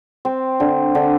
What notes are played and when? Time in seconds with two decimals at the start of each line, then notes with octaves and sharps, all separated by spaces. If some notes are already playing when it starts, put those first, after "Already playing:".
0.25 C4
0.60 D3
0.95 D3